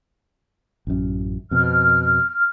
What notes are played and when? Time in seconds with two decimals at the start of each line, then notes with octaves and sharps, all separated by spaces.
0.87 A1 F#2
1.51 F2 B2 F6